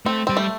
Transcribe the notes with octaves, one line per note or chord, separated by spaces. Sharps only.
A3 C4
G3 C4
A3